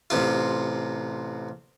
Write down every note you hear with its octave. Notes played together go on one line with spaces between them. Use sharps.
A1 C3 F4